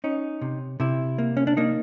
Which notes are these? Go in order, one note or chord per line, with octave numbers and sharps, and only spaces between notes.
C#4 D#4
C3
C3 E4
A#3
C#4
D4
A#3 D#4